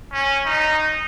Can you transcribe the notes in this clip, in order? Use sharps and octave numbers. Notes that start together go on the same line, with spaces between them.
C#4
D#4